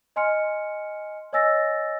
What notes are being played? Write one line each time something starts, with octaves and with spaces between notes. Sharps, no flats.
D#5 G#5 C6 F6 C#7
C#5 D#5 G#5 E6 A6 A#6